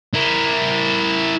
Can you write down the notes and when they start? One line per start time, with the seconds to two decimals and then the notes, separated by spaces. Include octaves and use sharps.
0.14 E4 A#4